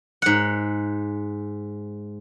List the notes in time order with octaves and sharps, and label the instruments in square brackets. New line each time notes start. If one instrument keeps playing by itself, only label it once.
[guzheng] G#2 F#5